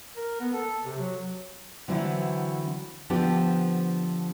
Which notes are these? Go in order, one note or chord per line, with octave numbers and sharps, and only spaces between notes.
A#4
B3
A4
C3
F#3
D3 E3 F#3 C4 E4
D3 F3 B3 C4 D4 G4